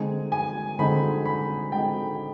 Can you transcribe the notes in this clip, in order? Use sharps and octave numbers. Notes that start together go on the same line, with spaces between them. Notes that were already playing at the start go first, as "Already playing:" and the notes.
Already playing: D3 G#3 C4 D#4 G#5
G#5
D3 G#3 C4 D#4 B5
B5
D3 G#3 C4 D#4 G5